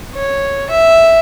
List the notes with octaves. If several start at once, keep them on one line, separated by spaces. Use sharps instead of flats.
C#5
E5